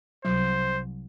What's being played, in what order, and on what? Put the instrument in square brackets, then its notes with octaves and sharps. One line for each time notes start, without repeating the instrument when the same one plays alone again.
[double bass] C2 [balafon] F#3 [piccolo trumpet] C5